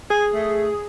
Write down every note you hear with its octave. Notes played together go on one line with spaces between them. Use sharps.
G#4 G#5
A3